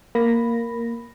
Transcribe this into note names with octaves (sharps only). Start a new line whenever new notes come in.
A#3 B5 A#6